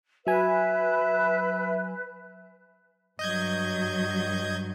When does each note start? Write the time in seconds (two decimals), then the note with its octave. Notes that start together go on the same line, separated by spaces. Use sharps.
0.27 F#3 B4 E5 G#5
3.19 G2 F#3 D#5 G6 G#6